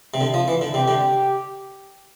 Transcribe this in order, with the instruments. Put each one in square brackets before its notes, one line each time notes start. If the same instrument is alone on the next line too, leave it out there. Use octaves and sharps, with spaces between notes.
[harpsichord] C3
D3
F3
E3
D3
[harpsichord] C3 [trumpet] G4
[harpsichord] D3